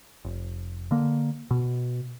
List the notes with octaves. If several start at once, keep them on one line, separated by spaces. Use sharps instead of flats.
F1
D3 A#3
B2